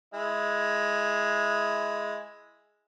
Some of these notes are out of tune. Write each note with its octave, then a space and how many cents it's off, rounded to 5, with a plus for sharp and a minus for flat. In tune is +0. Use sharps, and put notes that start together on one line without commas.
G#3 +5 E4 +10